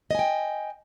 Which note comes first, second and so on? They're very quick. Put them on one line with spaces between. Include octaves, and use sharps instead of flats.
D#5 G#5 G5